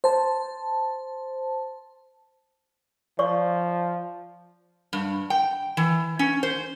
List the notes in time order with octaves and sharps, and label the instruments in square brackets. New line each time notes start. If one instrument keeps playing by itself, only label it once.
[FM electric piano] C5 A5
[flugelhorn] F3 [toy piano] D5 C#6
[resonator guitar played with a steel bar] G2
G5
E3
C#4
C5